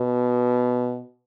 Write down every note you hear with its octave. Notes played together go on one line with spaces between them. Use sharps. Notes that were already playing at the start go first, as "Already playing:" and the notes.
Already playing: B2